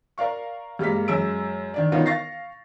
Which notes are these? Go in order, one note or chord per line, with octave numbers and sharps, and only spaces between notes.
A#4 D5 F5 C#6
G2 G3 G#3 A#3 B6
F#2 G#3 E6 D7
D#3 D4 D5
D#3 B3 C#4 D#4 F4 A#4
F5 C#6 A6 A#6 C7